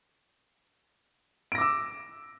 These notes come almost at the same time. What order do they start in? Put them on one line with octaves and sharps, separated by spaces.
D7 A#6 D6 E6